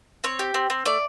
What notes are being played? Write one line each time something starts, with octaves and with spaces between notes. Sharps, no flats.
C4 C#5
G4
C4
C4
A3 D5